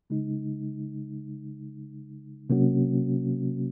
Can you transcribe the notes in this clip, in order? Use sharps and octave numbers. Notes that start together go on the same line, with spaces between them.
C#3 G#3 D#4
C3 F#3 A#3 C#4 F#4